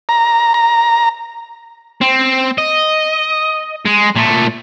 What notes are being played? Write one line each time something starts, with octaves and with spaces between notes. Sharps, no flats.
A#5
A#5
C4
D#5
G#3
A#2 A3